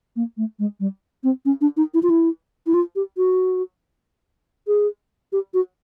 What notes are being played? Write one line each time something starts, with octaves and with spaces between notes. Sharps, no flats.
A#3
A3
G#3
G3
C4
C#4
D4
D#4
E4
F4
E4
E4
F4
G4
F#4
G#4
G4
F#4